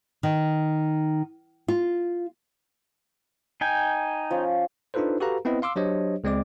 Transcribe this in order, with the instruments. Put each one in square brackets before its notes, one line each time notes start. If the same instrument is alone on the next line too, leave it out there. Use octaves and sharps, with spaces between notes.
[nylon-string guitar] D#3
F4
[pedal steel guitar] D#4 G5 G#5
[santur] F3 C#4
[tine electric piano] D4 D#4 F4 A4 B4 C5
F#4 G4 A4 B4 F5 A#5
B3 C4 E4 B4 D#5
F5 C6 D6 E6
F#3 D4 G4 C5 C#5 D#5
C#2 G#3 C4 D5 D6